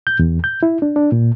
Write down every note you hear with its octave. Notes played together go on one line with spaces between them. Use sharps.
G6
E2
G6
E4
D4
D4
A#2